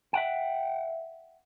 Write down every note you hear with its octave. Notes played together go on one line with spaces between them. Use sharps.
E5 F#5 G5